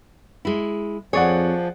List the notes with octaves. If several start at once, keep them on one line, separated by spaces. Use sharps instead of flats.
G#3 E4
F2 F3 G#4 C#5 D5 F#5